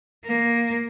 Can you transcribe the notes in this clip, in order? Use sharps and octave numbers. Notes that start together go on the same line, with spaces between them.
A#3